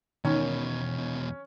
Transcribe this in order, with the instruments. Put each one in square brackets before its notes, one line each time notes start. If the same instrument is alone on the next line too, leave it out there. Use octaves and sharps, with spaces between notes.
[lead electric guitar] E2 B2 [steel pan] D#3 [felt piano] C#4